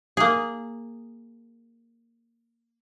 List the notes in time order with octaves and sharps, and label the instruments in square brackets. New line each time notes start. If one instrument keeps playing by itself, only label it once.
[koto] A#3 G#4